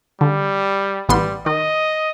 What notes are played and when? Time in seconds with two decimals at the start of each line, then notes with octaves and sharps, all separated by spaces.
0.21 D3 G3
1.09 A1 G3 B3 C6
1.46 D#3 D#5